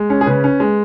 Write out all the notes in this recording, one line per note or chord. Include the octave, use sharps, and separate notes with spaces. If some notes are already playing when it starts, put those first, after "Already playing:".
Already playing: G#3
C#4
G#4
C#3 B4
C#4
G#3